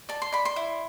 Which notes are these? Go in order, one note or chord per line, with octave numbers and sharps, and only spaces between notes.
D5 A5
C6
D5 B5
C6
E4